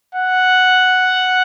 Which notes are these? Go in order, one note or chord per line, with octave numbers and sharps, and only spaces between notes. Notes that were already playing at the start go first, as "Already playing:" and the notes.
F#5